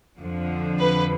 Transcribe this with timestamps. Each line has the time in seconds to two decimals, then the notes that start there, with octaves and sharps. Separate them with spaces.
0.18 F2 D3 F3
0.79 B4